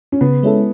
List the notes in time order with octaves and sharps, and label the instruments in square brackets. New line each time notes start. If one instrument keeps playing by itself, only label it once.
[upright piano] C#4
[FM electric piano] C#3 [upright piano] B3
[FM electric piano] G#3 C#4 E4 A4